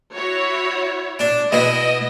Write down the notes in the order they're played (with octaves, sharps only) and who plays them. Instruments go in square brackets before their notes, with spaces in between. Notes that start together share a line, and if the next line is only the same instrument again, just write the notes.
[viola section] E4 F#4 C#5
[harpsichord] D4
[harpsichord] B2 E4 [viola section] D#5